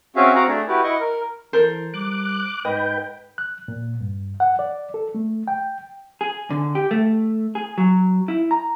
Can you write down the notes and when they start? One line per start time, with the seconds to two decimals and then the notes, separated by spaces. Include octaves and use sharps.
0.16 C4 C#4 F#4 G#4 E5 F5
0.35 C4 F#4 F5 F#5 A#5
0.48 A3 D4 G#4
0.68 E4 F#4 G4 B4
0.84 E4 D#5 C#6
1.00 A#4
1.53 E3 A4 A#4 C5
1.94 G3 D6 F#6
2.65 G#2 B4 D#5 G5
3.38 F#6
3.68 A#2
4.01 G2
4.40 F#5
4.59 D5
4.94 A4
5.15 A3
5.48 G5
6.21 G#4
6.50 D3
6.75 G4
6.91 A3
7.55 G#4
7.78 F#3
8.28 E4
8.51 A#5